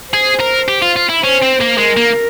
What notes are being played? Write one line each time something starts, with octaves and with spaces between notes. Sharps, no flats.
G#4 C5
A#4
G4
F4
F4
E4
C#4 C5
C4
A#3
G#3 A#4
A#3